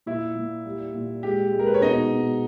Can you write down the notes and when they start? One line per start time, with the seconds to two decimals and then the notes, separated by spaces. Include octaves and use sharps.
0.06 A#2 E4
0.35 A#2
0.65 G3
0.94 A#2
1.23 G#3 G4
1.53 G#3
1.59 A#4
1.67 B4
1.74 C#5
1.81 B2 D#4 D#5
2.11 B2